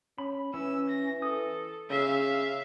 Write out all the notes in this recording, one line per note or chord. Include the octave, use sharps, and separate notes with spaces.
C#4 B5
E3 C#4 E6
A#6
A4 D#6
C#3 E5 F5